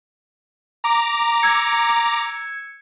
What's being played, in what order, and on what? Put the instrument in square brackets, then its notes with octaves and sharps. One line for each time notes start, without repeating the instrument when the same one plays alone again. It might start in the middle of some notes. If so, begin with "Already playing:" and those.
[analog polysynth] A#5 D6
[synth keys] E6 G#6 C#7